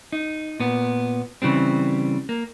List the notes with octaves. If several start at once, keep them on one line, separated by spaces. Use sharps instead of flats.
D#4
A#2 B3
C#3 E3 G3 C4
A#3